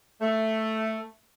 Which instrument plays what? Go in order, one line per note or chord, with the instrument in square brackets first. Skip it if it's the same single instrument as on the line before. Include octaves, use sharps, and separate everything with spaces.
[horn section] A3